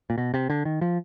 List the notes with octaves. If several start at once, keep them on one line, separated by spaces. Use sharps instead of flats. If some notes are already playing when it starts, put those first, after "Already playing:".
A#2
B2
C3
D3
D#3
F3